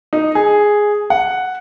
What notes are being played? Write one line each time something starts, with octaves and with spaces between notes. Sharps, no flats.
D#4
G#4
F#5